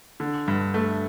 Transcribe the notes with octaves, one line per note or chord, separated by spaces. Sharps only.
D3
G2
A3